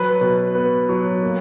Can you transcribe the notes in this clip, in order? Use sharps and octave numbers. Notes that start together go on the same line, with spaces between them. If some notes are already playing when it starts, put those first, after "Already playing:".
Already playing: F#3 B4
B2
B3
F#3
A#3